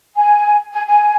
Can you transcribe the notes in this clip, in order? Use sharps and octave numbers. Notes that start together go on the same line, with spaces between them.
G#5
G#5
G#5